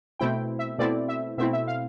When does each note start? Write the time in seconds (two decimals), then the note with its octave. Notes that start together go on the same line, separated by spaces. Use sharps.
0.20 B2 A3 C4 E4 G5
0.59 E5
0.78 B2 A3 C4 E4 D5
1.09 E5
1.38 B2 A3 C4 E4 E5
1.53 E5
1.68 F5